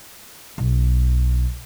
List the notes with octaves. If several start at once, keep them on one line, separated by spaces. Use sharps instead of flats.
B1